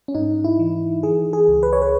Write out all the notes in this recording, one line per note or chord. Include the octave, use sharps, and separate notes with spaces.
C#4
G#2 D#4
E4
E3
E3 G#4
G#4
C#2
B4
C#5
B4